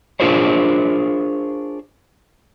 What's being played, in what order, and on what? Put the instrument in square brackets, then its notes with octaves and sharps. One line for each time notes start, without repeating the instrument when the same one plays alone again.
[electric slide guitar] D4 F4 G#4 A#4 C5 C#5